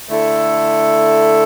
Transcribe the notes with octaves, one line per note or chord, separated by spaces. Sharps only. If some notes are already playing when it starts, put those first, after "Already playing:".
D3 A3 E4 A4